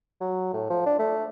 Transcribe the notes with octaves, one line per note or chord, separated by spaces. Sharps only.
F#3
A2
F3
D4
A3